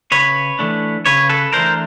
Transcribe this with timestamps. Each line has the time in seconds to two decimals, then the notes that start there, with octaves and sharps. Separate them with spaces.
0.11 C#3 B4 C#5
0.59 E3 A3 D4
1.06 C#3 B4 C#5
1.29 A4 B4
1.53 E3 A3 D4 A#4 C5